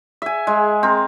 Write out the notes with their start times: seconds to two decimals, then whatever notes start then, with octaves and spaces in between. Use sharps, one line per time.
0.22 E5 G#5
0.47 G#3
0.83 C4 A#4